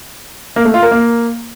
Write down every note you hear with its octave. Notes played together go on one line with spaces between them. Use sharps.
A#3
A3
F4
A#4
A#3